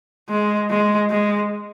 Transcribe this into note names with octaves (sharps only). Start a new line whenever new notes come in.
G#3
G#3
G#3